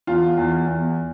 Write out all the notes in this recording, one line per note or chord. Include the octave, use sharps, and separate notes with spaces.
E2 F4
E2
E2